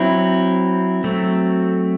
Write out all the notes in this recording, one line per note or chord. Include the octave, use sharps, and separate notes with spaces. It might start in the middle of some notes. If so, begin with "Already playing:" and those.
Already playing: F#3 C4 E4
F#3 A3 C4